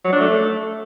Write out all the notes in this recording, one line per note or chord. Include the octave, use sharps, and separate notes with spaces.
F#3
D4
A3